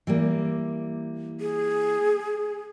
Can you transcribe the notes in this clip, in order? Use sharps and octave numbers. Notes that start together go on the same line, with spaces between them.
E3 G3 A#3
G#4